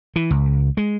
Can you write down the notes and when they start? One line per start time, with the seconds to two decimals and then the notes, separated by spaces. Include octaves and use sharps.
0.16 E3
0.31 C#2
0.77 G#3